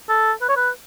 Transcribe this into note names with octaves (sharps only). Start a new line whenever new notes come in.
A4
B4
C#5
B4